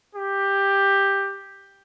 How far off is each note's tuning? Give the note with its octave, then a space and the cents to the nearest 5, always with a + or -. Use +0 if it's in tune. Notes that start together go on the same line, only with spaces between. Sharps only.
G4 +10